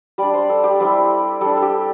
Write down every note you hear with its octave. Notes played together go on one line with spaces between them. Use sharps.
G3 D4 D5
C5
A4
G4
G3 C4 E4
G3 D4 A4
A4
G4